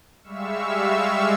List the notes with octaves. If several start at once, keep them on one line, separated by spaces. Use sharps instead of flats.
G3 G#3 E5 F5 C#6 E6